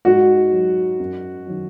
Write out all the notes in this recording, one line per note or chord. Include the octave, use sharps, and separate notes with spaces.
G#2 F#4
F#3
F#2
D#3 F#3